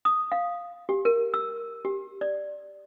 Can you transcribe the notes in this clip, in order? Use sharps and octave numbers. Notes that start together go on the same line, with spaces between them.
D#6
F5
G4
A#4
E6
G4
D5